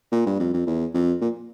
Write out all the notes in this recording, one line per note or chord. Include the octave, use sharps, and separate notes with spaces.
A#2
G2
F2
F2
E2
F2
A#2